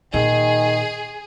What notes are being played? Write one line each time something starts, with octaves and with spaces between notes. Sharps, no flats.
A#2 D#3 G#4